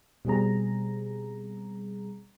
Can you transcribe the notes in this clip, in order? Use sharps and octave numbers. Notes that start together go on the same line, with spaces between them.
B2 G3 C4 G#4 A#5